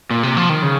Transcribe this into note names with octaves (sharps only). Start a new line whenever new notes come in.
A#2
C3
F3
D#3
C#3